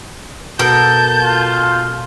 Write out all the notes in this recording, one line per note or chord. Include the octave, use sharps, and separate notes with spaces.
B2 A4 A#4 A5 G6
F4